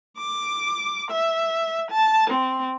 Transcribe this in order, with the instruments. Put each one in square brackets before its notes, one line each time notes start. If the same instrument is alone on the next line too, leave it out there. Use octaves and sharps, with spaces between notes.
[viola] D6
E5
A5
C4